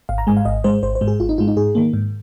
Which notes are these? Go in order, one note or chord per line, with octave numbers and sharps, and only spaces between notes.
G#1 F5
A#5
G#2 G#3 G#5
F5
G#1 D#5
G#2 G#3 C5
G#1 C5
C5
G#2 G#3
G#4
G#1 F4
D#4
G#2 G#3 F4
D#4
G#2 G#4
D#3 A#3
G#2